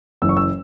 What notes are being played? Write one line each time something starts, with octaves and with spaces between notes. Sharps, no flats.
F#1 F#2 E3 E6
C#6
E6